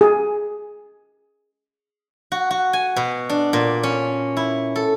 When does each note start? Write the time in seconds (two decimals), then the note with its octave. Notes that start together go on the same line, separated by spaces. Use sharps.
0.01 G#4
2.32 F#4
2.51 F#4
2.73 G#5
2.96 B2
3.29 D4
3.53 A#2
3.83 C#4
4.37 E4
4.76 A4